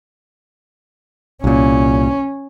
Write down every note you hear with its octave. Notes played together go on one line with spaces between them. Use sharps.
C2 A#2 C#4